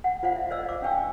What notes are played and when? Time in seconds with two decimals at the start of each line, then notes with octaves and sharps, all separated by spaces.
0.04 F#5
0.23 F4 C5 D5 F5 F#5
0.36 E5
0.50 C5 D5 D#5 E6
0.65 F5 D6
0.82 C#4 D4 G5 C#6 E6